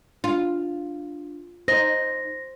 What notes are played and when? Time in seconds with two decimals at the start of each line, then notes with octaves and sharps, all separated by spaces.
0.24 D4 F4
1.68 D#4 C5 A#6